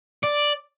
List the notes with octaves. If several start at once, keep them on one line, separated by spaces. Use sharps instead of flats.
D5